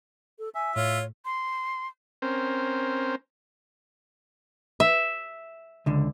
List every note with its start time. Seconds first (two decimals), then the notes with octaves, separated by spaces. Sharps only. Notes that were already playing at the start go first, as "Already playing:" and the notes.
0.39 A4
0.55 E5 G#5
0.76 A2 F4 C#5
1.25 C6
2.22 C4 C#4 A#4 C5
4.80 E5
5.86 C#2 D3